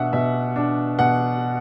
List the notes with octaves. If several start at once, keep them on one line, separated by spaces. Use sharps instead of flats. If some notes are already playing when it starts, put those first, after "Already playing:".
Already playing: B2 D4 E5 F#5
B2 E5
D4
B2 F#5